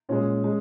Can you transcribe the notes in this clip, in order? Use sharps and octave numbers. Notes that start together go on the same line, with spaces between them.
A#2 G#3 C#4
G#3